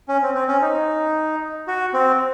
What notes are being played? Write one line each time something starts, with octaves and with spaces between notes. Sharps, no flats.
C#4
C4
C4
C#4
D#4
F#4
C4